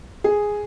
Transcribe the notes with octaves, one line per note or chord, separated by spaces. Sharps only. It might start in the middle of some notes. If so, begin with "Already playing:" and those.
G#4